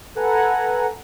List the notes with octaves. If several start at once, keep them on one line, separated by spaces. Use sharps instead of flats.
A4 B4 F#5 G#5 A#5